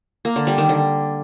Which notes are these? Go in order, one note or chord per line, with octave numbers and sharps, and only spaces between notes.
A#3
D3
G3
D#3
D3